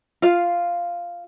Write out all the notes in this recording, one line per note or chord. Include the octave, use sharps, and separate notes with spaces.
F4 F5